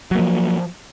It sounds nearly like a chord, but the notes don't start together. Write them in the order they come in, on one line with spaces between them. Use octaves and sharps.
F#3 A#3 F3